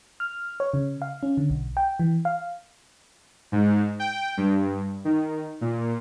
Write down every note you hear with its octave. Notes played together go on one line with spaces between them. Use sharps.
F6
C#5
C#3
F5
C#4
D3
B1
G5
E3
F5
G#2
G5
G2
D#3
A#2